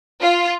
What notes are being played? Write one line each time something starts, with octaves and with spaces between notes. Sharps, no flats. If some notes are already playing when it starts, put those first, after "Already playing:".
F4